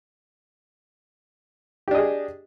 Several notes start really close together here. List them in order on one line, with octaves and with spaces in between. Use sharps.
G4 D4 D#5 G#4